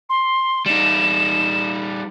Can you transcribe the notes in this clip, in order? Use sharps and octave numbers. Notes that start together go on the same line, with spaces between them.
C6
G3 D#4 E7